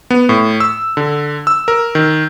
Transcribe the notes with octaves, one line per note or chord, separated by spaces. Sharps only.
B3
A2
E6
D3
E6
A#4
D#3